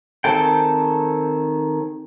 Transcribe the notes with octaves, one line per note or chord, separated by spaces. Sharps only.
D#3 C4 G#4 A4 G5